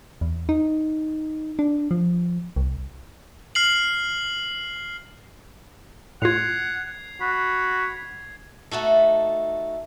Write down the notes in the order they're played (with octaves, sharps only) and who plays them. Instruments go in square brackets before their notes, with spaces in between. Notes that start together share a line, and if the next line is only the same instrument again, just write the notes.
[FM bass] E2
D#4
D4
F3
C2
[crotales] F6 C7 F#7
[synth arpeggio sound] A2 F4 [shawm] F#5 [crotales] G#6 C7 F7
[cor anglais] F#4 [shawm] B5
[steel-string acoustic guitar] A3 D#4 F#4 A4